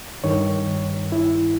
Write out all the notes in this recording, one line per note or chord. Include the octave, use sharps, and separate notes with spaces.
G2 D#3 C#5
E4